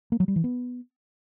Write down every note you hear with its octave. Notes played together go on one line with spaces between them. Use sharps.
A#3
F#3
G3
E3
B3